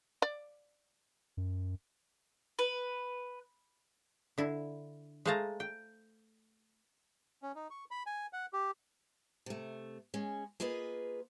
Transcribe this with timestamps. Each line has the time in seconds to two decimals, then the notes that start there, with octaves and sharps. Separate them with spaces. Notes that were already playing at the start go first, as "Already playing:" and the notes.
0.22 D5
1.37 F#2
2.59 B4
4.38 D3 E4
5.25 G#3 A3 C5 F5 A5 A#5
5.60 G5
7.43 C#4
7.55 D#4
7.70 C#6
7.91 B5
8.06 G#5
8.33 F#5
8.53 G4
9.46 C3 A3
10.14 G#3 C#4
10.60 A#3 F4 G#4 B4 D#5